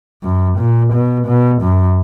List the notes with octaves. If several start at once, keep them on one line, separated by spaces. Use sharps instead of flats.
F#2
A#2
B2
B2
F#2